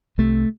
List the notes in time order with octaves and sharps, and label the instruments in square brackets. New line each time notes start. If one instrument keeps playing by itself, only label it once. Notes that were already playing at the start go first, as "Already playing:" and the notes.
[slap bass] C2 C3 A3